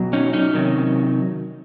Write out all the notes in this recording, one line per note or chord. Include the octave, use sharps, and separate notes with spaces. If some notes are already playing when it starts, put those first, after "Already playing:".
Already playing: B2 F#3
C#4 D#4
C#4 D#4
C3 D#3 F#3